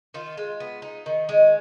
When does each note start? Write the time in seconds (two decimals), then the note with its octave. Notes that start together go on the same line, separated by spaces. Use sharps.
0.14 D#3 F4
0.38 G#3
0.60 B3
0.82 D#4
1.06 D#3
1.29 G#3